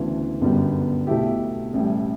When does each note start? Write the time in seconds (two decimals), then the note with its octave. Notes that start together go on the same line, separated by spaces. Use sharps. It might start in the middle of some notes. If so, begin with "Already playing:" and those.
Already playing: D2 C#3 E3 B3 D4
0.41 G1 F#2 D3 G3 B3
1.07 B1 B2 A3 E4 G4
1.73 A1 A2 G3